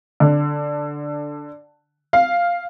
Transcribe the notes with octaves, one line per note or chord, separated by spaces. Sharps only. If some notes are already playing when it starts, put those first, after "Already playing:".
D3
F5